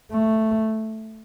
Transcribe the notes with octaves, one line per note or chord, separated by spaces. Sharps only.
A3